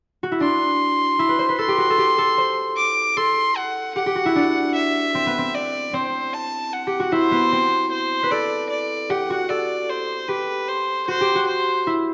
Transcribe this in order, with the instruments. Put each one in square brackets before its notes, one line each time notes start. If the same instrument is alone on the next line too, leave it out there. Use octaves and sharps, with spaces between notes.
[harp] F#4
E4
[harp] D4 [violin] C6
[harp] E4
B4
C5
B4
[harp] A4 [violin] C6
[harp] G4
F#4
A4
G4
A4
C5
[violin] D6
[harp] A4 [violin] C6
[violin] F#5
[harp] G4 [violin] F#5
[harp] G4
F#4
E4
D4
[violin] E5
[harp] C4
B3
C4
[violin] D5
[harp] C4 [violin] C5
[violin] A5
F#5
[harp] G4
F#4
[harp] E4 [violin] C5
[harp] B3
C4
[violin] C5
[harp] B4
[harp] A4 [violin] D5
[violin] D5
[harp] G4 [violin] F#5
[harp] F#4
[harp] A4 [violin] D5
[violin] C5
[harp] G4 [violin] B4
[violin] C5
[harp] F#4 [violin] C5
[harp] G4
F#4
[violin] C5
[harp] E4